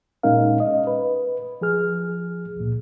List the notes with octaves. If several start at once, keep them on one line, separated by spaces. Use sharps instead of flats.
A#2 G#3 C#4 D#4 A#4 F5
D#5
B4
F3 G#4 F6
C#2 A#2